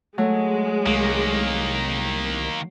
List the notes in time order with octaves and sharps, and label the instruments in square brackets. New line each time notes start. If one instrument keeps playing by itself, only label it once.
[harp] F#3 A3 [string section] G#3
[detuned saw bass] C2 [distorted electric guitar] D#3 A#3